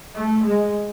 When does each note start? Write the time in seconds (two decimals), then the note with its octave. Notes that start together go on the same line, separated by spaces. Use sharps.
0.15 A3
0.44 G#3